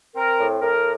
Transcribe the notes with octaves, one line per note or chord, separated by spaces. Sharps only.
C4 A#4
A2
A2 A#4